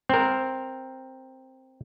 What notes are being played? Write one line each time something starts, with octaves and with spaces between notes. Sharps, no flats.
C4 A#4